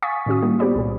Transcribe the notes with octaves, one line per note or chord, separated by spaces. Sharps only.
F5 G#5 C#6 D#6 A6 B6
A2 D#3 C#4 F#4 D#6
G3 A#3 D#4 E4 F#4
B3 F4 G4 C5 D5 B5
C2 A#2 G4